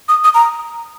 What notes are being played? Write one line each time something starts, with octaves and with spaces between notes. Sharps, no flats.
D#6
D#6
A#5